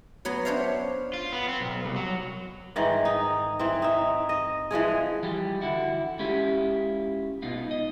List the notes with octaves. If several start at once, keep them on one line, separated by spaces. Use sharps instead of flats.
F#3 B3 C#5
D4 C5 C#5 E5 F5
F4
B3
C4
B1
C2
F#3
G#2 D#3 E3
D#4
E3 C4
D#4 E5
D#5
E3 F3 G#3 G#4
E3 F3 G3 G4
D3 E4 F#4
G#3 C#4 E4 F4 G4 G#4
B2 B3 D#4 F4
D#5